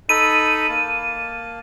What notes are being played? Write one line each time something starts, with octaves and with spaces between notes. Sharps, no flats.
D#4 A4 B5 D#7
A#3 A5